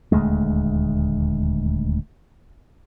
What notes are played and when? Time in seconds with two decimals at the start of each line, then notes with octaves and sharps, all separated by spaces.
0.12 D#1 D2 G#3 A3